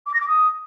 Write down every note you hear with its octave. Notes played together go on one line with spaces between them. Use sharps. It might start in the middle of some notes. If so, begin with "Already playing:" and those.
D6
A#6
D6
D#6